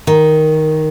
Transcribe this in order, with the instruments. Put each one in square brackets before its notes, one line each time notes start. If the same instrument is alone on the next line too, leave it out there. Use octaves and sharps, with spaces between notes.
[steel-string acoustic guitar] D#3